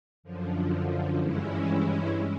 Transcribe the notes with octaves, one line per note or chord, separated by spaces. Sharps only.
F#2 D3 F3
G2 E3 G#3 C#4 E4